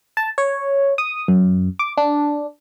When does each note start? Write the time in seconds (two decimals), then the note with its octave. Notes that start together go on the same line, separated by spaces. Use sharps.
0.17 A5
0.38 C#5
0.98 D#6
1.28 F#2
1.79 D6
1.97 D4